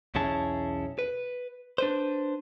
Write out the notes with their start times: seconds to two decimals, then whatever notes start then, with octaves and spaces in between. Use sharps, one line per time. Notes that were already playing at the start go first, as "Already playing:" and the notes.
0.15 B1 E2 C#4 E4 G#4 A5
0.99 B4
1.78 D4 B4 C5